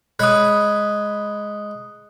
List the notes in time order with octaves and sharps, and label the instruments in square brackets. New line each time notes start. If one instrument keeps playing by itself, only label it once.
[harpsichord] G#3 C#5 B5 [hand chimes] D#6 F#6